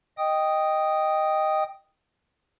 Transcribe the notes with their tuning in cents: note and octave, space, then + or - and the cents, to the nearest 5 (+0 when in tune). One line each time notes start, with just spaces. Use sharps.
D#5 +0 G5 +0 D#6 +0